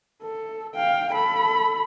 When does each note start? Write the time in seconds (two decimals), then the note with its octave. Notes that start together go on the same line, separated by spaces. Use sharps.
0.23 A4
0.75 F5 G5
1.13 A4 B5